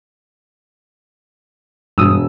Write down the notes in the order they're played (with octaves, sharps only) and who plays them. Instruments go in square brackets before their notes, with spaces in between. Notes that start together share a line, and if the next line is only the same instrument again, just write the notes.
[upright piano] E1 E6 [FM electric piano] G2 D#6